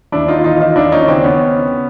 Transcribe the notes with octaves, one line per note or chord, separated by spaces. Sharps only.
D#2 D4 E4
D#4 F4
E3 D#4 F4
D#4 F4
D#2 D4 E4
C#4 D#4
C#3 C4 D4
B3 C#4